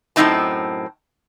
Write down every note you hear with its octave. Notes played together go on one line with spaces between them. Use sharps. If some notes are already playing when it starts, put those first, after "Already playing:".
F#2 A2 C#3 C4 D#4 A5